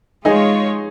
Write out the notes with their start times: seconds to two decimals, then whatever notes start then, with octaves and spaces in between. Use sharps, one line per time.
0.25 G#3 D#4 F4 G#4 C#5